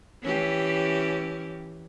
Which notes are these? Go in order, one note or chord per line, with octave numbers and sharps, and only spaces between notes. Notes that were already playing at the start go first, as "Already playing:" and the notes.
E3 C#4 G4